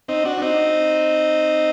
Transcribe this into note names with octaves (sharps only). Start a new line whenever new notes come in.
C4 D#4
D4 F#4
D4
C4 D#4